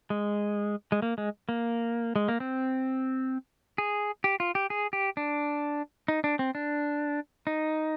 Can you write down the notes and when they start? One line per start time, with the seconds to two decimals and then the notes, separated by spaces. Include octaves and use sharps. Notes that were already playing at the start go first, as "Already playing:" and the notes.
0.10 G#3
0.92 G#3
1.02 A#3
1.18 G#3
1.49 A#3
2.16 G#3
2.28 A#3
2.40 C4
3.78 G#4
4.24 G4
4.40 F4
4.55 G4
4.70 G#4
4.93 G4
5.17 D4
6.08 D#4
6.24 D4
6.39 C4
6.55 D4
7.47 D#4